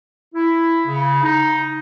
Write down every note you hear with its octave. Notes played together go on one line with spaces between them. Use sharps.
E4
C#3
D#4